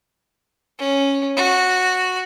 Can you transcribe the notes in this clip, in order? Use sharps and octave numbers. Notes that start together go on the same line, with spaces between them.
C#4
F#4